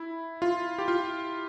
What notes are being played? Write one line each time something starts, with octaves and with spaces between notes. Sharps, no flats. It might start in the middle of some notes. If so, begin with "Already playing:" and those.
Already playing: E4
F4
G4
F4